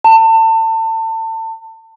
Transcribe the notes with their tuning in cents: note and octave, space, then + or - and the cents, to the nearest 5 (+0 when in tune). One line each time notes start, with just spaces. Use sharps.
A5 +30